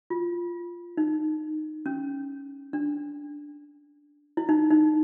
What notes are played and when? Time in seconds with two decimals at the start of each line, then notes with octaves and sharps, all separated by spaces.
0.10 F4
0.97 D#4
1.86 C#4
2.73 D4
4.37 E4
4.49 D#4
4.70 D#4